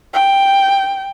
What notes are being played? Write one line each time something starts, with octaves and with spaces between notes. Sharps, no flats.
G5